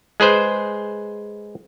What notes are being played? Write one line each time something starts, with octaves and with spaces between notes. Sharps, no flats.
G#3 G#4 B4 C5